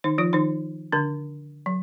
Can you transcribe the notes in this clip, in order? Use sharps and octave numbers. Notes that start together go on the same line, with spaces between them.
D#3 D#4
F3 F4
D#3 D#4
D3 D4
F#3